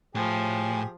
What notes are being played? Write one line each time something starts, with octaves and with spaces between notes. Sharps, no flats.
A2 F3 G4 G#4